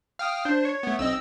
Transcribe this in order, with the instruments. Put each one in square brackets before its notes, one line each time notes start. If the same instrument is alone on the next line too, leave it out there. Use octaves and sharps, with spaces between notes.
[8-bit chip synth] F5 G5 D#6 [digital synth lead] F6
[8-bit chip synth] D4 [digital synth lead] C5
[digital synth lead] C#5
[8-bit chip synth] A3 B3
[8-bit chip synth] B1 C4 D#5 [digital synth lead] E6